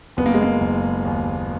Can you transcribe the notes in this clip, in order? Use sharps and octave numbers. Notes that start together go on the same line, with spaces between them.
F#1 B3
A#3
G#3
A#3
F#1
D#2